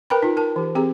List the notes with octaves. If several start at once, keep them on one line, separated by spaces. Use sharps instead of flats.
A#4 B4 G5 A#5 B5
D#4 F4
A#4 A5
E3 G4
C4 G4 G#4 A#5